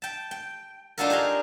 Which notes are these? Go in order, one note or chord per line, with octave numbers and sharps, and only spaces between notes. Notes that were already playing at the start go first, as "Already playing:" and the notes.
G5 A5
G5
D4 D#4 F4 F#4 A4 A#4
G4 G#4 F5 A#5